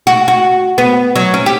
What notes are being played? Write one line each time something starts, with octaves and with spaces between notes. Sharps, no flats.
F#4
F#4
B3
F#3
C#4
G4